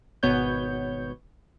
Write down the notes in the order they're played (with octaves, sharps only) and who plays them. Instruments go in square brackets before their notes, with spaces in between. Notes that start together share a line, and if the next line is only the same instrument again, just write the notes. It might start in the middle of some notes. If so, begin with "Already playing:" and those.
[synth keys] G#1 B2 B3 C#5 G6